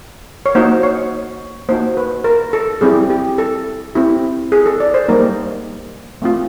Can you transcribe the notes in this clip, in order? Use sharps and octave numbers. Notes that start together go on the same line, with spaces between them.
C#5
A#3 D#4 F#4 C5
C#5
A#3 D#4 F#4 C5
B4
A#4
A4
G3 C4 E4 G4 G#4
G4
A4
C4 E4 G4
G#4
A4
D5
C5
G3 A#3 D#4 A#4
A3 C4 F4